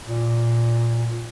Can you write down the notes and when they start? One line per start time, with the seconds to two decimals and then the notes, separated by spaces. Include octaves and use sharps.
0.06 A#2